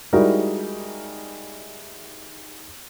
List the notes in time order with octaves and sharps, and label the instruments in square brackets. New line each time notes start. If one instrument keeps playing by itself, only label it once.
[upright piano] G3 G#3 D#4 E4 F#4 A#4